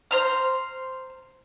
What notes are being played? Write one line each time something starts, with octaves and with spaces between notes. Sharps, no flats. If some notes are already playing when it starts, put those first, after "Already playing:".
C5 A#5 F6